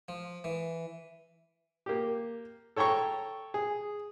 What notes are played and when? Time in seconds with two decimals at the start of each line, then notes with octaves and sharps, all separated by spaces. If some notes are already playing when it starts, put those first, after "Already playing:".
0.08 F3
0.44 E3
1.86 A#3 G4
2.76 A4 C#5 G5 A#5 C#6
3.54 G#4